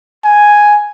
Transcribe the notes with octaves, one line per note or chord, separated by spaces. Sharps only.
G#5